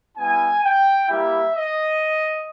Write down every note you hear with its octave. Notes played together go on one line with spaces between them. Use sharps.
G3 B3 E4 G#5
G5
G3 A#3 E4 G4 E5
D#5